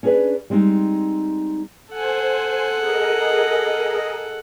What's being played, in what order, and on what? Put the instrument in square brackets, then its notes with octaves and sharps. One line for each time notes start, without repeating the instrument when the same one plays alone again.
[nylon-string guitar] C#4 D4 G#4 A#4 B4 D5
G3 G#3 C4 D#4
[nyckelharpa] A4 F#5 [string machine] C5 G#5
[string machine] G#4 A#4 D#5